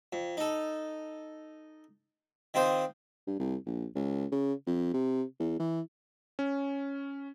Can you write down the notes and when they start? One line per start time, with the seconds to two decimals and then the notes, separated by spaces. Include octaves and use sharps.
0.13 F2
0.37 D#4 A4
2.54 D#3 C4 F4 C5 D#6
3.27 G2
3.39 C2
3.66 A#1
3.95 C#2
4.32 C#3
4.66 F2
4.94 C3
5.40 E2
5.59 E3
6.39 C#4